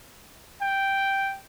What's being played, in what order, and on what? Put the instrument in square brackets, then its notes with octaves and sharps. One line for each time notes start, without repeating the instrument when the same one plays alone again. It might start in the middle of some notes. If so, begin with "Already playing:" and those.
[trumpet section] G5